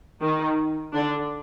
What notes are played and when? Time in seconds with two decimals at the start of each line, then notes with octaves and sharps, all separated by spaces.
0.21 D#3 D#4
0.94 D3 D4